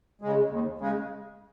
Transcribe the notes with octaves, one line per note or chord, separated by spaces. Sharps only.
C#3 G#3
D#2
C#3 G#3